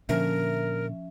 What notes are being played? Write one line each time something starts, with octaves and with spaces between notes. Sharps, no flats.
A#2 D3 F3 C#4 A#4 E5